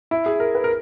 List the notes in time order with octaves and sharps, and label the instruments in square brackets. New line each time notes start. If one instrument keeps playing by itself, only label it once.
[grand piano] E4
G#4
A#4
B4
A#4